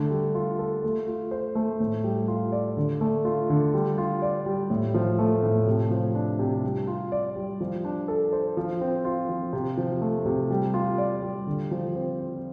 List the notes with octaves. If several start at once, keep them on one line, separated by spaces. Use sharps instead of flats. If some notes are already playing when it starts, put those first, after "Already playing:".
Already playing: D3 A3
G3
F4
A4
A3
F4
C5
A3
A2
G3
F4
D5
D3
A3
F4
D3
G3
F4
D5
G3
A2
F3
A3
A2
C3
F3
D4
C3
G3
F4
D5
G3
F3
D4
A4
C5
F3
C4
F4
F3
C3
F3
A3
C3
G3
F4
D5
G3
D3
F3
C4
F4